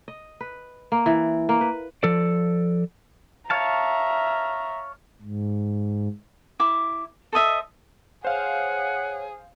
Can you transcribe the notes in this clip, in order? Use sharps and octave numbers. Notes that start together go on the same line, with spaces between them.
D#5
B4
A#3
E3
A#3
B4
F3 A4 D5
C#5 E5 F5 A5 A#5
G#2
E4 D6
A4 C5 D#5 E5
G#4 C5 C#5 F5 F#5